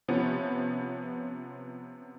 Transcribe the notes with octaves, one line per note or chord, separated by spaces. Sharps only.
C3 F3 B3 C#4